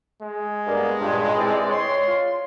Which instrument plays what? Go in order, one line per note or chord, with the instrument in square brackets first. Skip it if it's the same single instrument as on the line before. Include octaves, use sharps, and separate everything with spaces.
[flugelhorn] G#3
[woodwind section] G2 A#3 B3
C#2 G2 A#2
E3 C4 D5
C#5 C6
[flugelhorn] F4